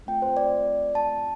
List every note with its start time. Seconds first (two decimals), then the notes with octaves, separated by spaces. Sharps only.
0.07 A3 C4 F4 G5
0.22 C5
0.37 D5
0.95 A5